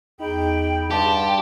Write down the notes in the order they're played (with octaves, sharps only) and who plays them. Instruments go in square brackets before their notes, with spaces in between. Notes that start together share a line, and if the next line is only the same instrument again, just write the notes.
[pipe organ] E2 G#4 B5 [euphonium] D#4 [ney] G5
[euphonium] G2 [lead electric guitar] G4 [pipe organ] F#5 C6 D6 [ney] A5